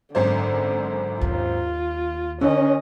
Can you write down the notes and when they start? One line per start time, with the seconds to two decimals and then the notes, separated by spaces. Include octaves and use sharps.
0.15 G#1 F#2 D3 C5
1.21 D#2 F4
2.41 D3 D#3 C#4 D#5